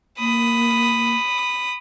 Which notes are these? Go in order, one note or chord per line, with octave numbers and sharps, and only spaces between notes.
A#3 B5 D#6